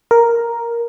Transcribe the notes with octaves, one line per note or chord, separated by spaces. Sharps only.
A#4